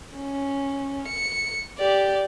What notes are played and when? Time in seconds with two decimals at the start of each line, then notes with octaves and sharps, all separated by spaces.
0.16 C#4
1.08 C#7
1.79 G4 D5